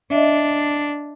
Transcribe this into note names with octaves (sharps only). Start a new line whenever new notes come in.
D4 D#5 E5